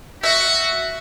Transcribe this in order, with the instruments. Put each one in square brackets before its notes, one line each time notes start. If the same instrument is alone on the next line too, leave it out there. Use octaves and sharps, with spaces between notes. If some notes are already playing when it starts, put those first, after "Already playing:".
[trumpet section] F#4 [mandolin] E5